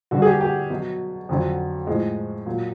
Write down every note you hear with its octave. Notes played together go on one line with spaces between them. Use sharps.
G2 D3 G3 F#4
G#4
G4
G4
B2 F#3
F2 D3 F#3
A2 F3 G#3
A#2 F#3